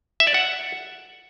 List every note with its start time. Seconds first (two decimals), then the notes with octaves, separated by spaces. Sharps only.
0.20 E5
0.27 D5
0.34 F#5